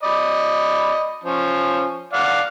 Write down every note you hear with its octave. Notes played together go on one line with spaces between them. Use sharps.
D5 D#5 B5
F3 C#4
D5 F5 F#5